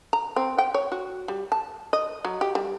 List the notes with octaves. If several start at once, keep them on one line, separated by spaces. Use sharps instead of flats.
A#5
C4
G5
C#5
F#4
G3
A5
D#5
F#3
G4
G3